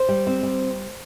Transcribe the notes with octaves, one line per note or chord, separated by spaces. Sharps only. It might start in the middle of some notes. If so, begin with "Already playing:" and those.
Already playing: C5
G3
C4
G3